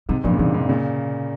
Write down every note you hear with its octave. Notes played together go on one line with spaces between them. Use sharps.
G#2 C3 G3
G2 A#2 F3
C#3
G#2 C3 E3
G#2 C3
A#2 C#3